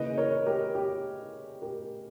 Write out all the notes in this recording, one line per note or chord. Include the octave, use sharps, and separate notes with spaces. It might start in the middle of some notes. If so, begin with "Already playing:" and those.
Already playing: C#3 E3 A#3 B4 D#5
A#4 C#5
G4 A#4
G4
G4 A#4